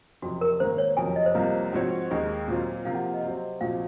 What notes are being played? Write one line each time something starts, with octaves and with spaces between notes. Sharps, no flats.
F#1 F2 C3 F#4
A#4
G#2 D#3 A#3 C5
C#5
F#1 F2 C3 F#3 G#5
D#5
C5
C2 C3 F3 A#3 F4
G#2 F3 C4 F#4 C#5
D#2 D#3 G#3 D#5
A#2 F#3 C4 F4
C3 F3 A#3 F4 F5
F#5
F5
D#5
C3 F#3 C4
A#1 A#2 F3 C4 F#4 F5